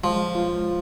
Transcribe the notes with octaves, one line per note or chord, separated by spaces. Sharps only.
F3 G#3
F4